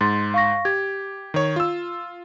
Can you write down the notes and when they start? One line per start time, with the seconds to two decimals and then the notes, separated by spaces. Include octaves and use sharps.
0.01 G#2 C6 A6
0.34 F5 C#6 A#6
0.65 G4 G#6
1.34 D#3 C#5
1.56 F4 E6